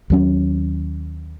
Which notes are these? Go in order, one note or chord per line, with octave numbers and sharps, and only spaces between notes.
D#2 F#3 C#4